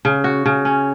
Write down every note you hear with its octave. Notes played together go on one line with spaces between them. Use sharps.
C#3
F#4
C#3
C#4